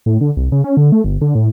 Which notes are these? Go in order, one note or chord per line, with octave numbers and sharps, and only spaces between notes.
A2
D3
C2
C#3
C#4
D3
A3
G1
D3
A2